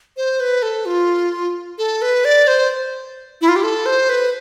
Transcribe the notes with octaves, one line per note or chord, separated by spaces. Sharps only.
C5
B4
A4
F4
A4
B4
D5
C5
E4
F4
G4
A4
C5
B4